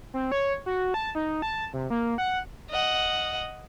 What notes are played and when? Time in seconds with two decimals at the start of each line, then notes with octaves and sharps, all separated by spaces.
0.14 C4
0.32 C#5
0.66 F#4
0.94 A5
1.15 D#4
1.42 A5
1.73 C3
1.90 A#3
2.18 F#5
2.70 D#5 F#5